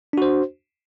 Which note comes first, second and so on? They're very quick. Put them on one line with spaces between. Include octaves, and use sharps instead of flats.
D4 F#4 C5